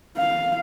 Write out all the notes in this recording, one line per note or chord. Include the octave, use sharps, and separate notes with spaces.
F5